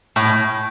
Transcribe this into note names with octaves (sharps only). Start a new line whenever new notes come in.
A2